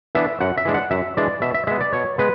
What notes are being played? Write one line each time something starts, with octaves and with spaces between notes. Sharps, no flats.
E3 B3 D4 E5
F#2 F#5
E5
E3 G#3 D4
F#5
F#2 E5
E3 G#3 D4 D5
B2 E5
E5
G#3 B3 E5
D5
B2 C#5
G#3 B3 B4